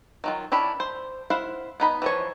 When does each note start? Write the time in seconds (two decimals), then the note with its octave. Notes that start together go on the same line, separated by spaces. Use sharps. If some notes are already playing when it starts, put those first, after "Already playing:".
0.24 D#3 F#3 F4
0.52 C#4 D4 E4 B5
0.80 C5
1.30 E4 C5 F5 F#5
1.80 B3 D#4 B5
2.02 E3 F3 C#5